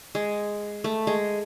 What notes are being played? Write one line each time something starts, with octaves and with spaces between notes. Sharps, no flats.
G#3
A3
G#3